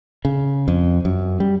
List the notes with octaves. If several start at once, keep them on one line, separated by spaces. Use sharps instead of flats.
C#3
F2
F#2
G3